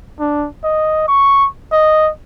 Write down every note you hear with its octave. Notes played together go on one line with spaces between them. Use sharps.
D4
D#5
C#6
D#5